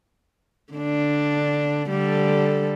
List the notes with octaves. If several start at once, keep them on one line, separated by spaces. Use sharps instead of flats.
D3 D4
D3 G3 A4